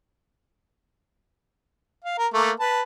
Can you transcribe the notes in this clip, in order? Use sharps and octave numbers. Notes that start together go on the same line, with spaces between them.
F5
A#4
A3 A#3
B4 A5